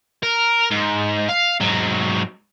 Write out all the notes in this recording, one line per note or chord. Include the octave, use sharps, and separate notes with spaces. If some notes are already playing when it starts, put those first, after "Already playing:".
A#4
G#2
F5
G#2 F#3